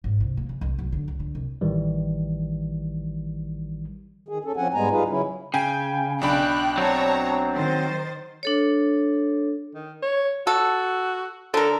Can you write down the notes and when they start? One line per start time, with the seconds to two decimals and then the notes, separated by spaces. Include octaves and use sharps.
0.04 G#1
0.20 C2
0.37 A#3
0.49 C#3
0.61 C2
0.79 B1
0.92 D3
1.08 C#2
1.20 D3
1.35 C2
1.61 A1 D#3 E3 G3
4.29 D#3 G#4
4.45 C#4 A4
4.56 F3 C4 C#4 F#5 G#5
4.74 G#2 G3 G#3 B3 G#5 A#5
4.90 G3 D#4 F4 G#4 B4
5.09 C#3 F#3 C#4 E4
5.54 C#3 G5 G#5
6.21 B1 D4 G5 B5 F#6
6.78 F#3 C4 C#5 A5 A#5
7.56 D#3 C5 A6
8.43 D4 A4 C#5
9.75 D#3
10.03 C#5
10.47 F#4 A4
11.54 D3 A4 A#4